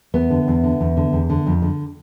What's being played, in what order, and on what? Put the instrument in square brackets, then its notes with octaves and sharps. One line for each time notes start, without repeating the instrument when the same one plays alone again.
[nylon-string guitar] E2 B3
D3
E2
D3
E2
D3
E2
D3
F2
D3